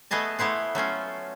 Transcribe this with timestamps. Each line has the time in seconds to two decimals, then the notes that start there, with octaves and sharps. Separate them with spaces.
0.11 A3 B3 G#4 D#5 A5
0.39 A3 B3 E4 C5 F#5
0.75 F#3 A3 C#4 F4